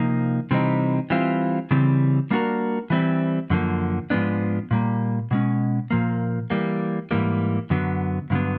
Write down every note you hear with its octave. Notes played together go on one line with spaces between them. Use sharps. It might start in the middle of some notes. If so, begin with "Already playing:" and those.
Already playing: C3 F3 A#3 D#4
C3 E3 G3 C4 D#4
E3 G3 C4 F4
C#3 E3 G3 C4
G3 A#3 D4 F#4 A#4
E3 G3 C4 E4
F#2 D3 F3 A#3
G#2 F3 G#3 B3 D4
A#2 G3 A#3
B2 G#3 C#4
A#2 F3 A#3
E3 G3 A#3
G#2 E3 G3 A#3
F#2 D3 F#3 B3
G2 D3 F#3 B3